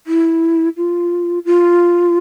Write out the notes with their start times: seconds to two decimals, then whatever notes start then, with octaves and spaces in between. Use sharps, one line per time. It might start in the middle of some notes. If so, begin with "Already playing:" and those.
0.07 E4
0.77 F4
1.45 F4